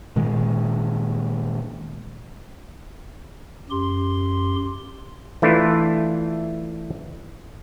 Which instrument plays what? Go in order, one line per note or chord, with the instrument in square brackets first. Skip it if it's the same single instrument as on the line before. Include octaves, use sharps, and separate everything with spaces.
[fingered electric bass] A#2 D#3 G#3
[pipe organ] F#2 G4 C6
[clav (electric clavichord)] E3 A3 D4 E4 F4